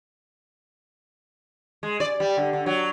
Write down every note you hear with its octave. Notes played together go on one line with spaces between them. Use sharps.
G#3
D5
G3
D3
D3
F#3